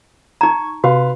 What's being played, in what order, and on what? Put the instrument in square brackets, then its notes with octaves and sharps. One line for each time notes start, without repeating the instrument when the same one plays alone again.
[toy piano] D#4 A#5 [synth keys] C#6 G#6
[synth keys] C3 [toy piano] F#4 [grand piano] B4 F5 C6